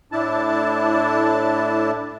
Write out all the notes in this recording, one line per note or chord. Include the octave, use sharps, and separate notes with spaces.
A2 D4 E4 A5